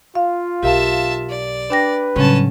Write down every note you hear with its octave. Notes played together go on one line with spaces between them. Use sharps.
F4 F5
B1 G4 A#4 E5 F5 A5
D5
D4 B4 G5 A#6
A2 C#3 F#3 G3 C#4 A5